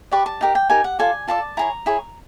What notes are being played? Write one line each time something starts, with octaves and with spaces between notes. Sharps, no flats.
G4 B4 D5 C#6
A5
D#4 G4 A#4
G5
D#4 G4 A#4 G#5
F#5
F4 A4 D5 G#5
F4 A4 D5 A5
E4 G#4 C#5 A#5
E4 G#4 C#5